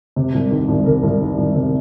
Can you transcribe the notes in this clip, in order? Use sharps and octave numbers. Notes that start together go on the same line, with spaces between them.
C3
C2
D#3
C2
C3 A#4
C2
D#3
C2
C3